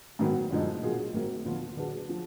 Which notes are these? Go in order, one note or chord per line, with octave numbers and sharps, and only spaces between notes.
G#2 D#3 F#3 B3
F#2 D3 F3 G#3 D#4
B2 F#3 A#3 F4 G#4
G#1 G#2 D#3 F#3 A#3
D#2 D3 F3 B3 F4
D3 F#3 D4 G#4 B4
F3